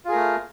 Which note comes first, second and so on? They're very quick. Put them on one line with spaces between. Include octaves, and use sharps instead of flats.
F4 G#4 A#4 A3